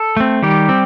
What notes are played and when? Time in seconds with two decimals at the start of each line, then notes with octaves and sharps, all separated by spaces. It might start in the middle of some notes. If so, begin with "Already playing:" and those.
Already playing: A4
0.17 A3 C4
0.43 D#3 G3 G4
0.69 C4